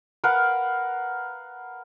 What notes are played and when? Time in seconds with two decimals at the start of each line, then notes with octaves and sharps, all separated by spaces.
0.24 A#4 B4 F5 F#5